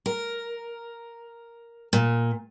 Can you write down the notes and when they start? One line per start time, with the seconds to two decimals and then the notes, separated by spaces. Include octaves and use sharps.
0.06 A#4
1.93 A#2